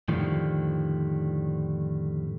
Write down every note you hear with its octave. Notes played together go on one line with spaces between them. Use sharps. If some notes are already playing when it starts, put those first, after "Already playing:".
F2 A2 D3 D#3 F3 G3